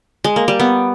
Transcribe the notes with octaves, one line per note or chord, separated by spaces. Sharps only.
G#3
A#3
G3
B3